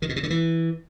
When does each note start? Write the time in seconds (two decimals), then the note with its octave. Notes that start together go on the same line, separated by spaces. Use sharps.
0.02 D#3
0.09 B2
0.16 C3
0.23 D3
0.30 E3